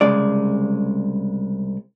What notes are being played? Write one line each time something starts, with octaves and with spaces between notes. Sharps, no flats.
C2 C#3 G#3 D5